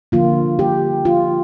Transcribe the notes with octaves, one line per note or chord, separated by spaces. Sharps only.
D3 F3 A#3 F4
G4
F4